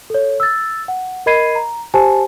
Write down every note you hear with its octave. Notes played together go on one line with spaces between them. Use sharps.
A4 C#5
E6 A6
F#5
A#4 D#5 B5 G#6 C7 D#7
A#5
G4 C5 G#5 A5